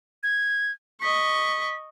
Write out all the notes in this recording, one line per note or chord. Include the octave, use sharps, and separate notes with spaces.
G#6
D#5 C#6 B6